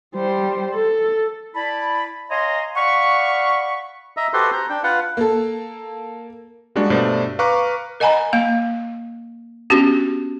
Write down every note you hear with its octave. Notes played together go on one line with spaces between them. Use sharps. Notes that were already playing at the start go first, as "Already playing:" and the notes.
G3 C5
A4
E4 D5 A5 B5
C#5 D#5 F5 G#5 A#5 C6
D5 F5 F#5 B5 C#6
D#5 E5 A#5
F#4 G4 A4 B4 C5 C6
C5 A#5
D4 G5
F4 B4 F5 F#5
A#3 A4
G3 G#3 A#3 D4 F#4
G2 B2 A3 C5 D5
B4 F5 A#5 C#6 D6 F#6
A#4 D#5 F#5 G#5 A#5 B5
A#3 F5
B3 C#4 D4 F#4 G4